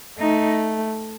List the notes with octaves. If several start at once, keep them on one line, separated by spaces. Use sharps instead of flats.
A3 D#4